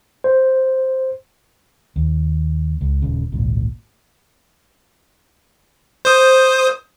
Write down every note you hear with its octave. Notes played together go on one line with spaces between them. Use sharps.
C5
D#2
C#2
D#1 C#3
G#1 C#2 A#2
C5 D#6